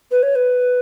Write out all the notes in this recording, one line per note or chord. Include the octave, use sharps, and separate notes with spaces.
B4
C#5
B4